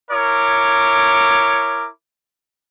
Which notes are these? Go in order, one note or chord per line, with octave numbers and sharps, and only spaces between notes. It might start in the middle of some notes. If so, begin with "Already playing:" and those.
E4 A#4 C#5 D6